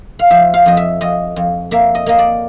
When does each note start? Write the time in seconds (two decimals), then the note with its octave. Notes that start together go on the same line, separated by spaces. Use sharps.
0.19 F5
0.30 F3 E5
0.54 F5
0.66 F2 D#5
0.77 E5
1.01 F2 D#5
1.36 F2
1.71 A#3 E5
1.95 D#5
2.06 A#3 D#5
2.18 D5